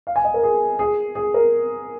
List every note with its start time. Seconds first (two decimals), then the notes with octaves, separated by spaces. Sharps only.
0.07 F5
0.16 G#5
0.24 D#5
0.34 A#4
0.43 G#4
0.79 G#4
1.15 G#4
1.34 A#4